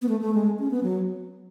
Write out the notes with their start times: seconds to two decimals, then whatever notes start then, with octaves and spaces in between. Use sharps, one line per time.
0.02 B3
0.09 A3
0.21 A3
0.34 G#3
0.59 C#4
0.71 B3
0.83 F#3